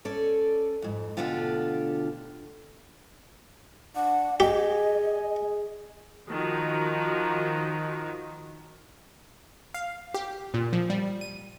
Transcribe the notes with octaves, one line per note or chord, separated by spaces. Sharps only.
C#4 A4 D5
F2 G#2
D2 B2 D3 D4 F4 G4
D4 F#5
G4 G#4 D#5 G#5
D#3 F3 F#4
F5
G4
A#2
F3
G3
D#7